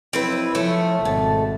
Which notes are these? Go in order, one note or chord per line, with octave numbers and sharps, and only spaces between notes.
F2 F#3 C4 E4 B4
F3 A3 C#4
G#1 B2 A5